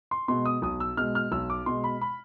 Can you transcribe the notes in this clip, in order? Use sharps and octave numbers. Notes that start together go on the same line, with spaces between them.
C6
B2 G#3 C6
D#6
B1 D#6
E6
B2 G#3 F6
F6
B1 E6
D6
B2 G#3 C6
B5
B5